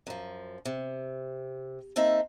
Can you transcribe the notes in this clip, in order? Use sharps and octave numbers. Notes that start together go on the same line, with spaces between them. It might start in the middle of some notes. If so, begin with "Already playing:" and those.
F#2 F3
C3
A#3 C4 D#4 E5 A5